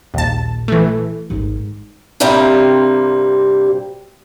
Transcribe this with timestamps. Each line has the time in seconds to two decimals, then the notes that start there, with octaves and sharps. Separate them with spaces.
0.14 A#1 D#2 A5
0.68 E3 A3
1.30 G#1 G#2
2.20 G2 C3 G3 A#3 C4